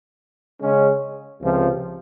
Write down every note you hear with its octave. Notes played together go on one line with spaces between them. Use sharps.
C#3 G#3 C#4
C#2 C3 F3